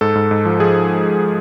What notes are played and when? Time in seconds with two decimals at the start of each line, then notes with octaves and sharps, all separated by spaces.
0.01 G#2 A4
0.15 G#2
0.31 G#2
0.45 F3
0.60 F3 G#4